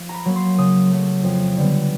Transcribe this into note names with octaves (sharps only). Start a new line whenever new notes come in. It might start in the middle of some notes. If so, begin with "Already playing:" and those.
Already playing: F3
A#5
B5
F#3 A#3
C6
C#3 D#6
F#3 A3
F2
D3 G3 B3